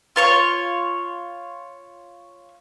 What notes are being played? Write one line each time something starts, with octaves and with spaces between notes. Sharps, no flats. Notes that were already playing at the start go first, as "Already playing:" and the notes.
F4 C#5 C#6